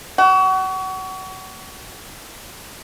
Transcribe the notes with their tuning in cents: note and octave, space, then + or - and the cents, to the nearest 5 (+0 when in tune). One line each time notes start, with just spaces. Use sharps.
F#4 +30